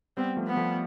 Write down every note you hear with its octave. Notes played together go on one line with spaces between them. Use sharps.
G3 B3 C4
F3 A3
B3
F3 A3